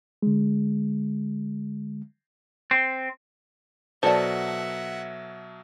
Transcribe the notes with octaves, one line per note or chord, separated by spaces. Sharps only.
D3 G#3
C4
B2 F#3 A4 C5 D5 E5 F#5 A5